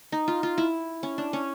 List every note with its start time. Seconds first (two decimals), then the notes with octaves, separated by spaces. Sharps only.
0.12 D#4
0.28 F4
0.43 F4
0.58 E4
1.03 C#4
1.18 D4
1.33 C#4